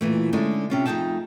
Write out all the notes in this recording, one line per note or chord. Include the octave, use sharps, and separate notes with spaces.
A#2 E3 A3
D3 G#3 A3 C#4 D#4
C3 C#4 F4
F2 A3 D#4 G#4 G5 A5